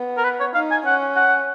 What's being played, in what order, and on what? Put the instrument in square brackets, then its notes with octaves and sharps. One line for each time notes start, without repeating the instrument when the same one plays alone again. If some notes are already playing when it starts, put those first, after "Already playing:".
Already playing: [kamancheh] B3
[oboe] A#4
B4
C#5
[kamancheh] D#4 [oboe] F5
[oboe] G#5
[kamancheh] C#4 [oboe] F#5
[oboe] F#5